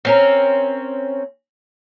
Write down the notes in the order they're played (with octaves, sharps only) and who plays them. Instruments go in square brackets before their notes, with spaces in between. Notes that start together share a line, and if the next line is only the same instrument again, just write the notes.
[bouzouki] C4 C#4 A#4